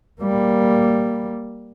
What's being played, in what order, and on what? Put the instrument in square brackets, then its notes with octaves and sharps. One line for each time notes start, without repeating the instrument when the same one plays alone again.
[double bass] G3 A#3